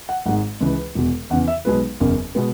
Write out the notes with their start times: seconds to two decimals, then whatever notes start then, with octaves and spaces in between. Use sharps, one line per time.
0.09 F#5
0.26 G#1 G#2 G#3 F#5
0.61 C#2 C#3 E3 B4
0.95 E1 E2 B2
1.30 E2 C#3 E3 F#5
1.48 E5
1.65 B1 B2 G#3 B3 B4
2.00 F#1 E2 C#3
2.35 B2 G#3 B3